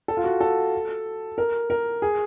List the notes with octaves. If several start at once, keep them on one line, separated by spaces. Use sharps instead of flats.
A4
F4
F#4
A4
A#4
A#4
G#4